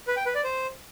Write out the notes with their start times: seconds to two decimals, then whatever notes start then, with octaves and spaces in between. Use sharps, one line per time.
0.07 B4
0.17 G5
0.26 B4
0.35 D5
0.44 C5